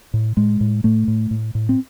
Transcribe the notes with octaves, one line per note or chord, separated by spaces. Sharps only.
A2
A2 G#3
A2
A2 A3
A2
A2
A2
C4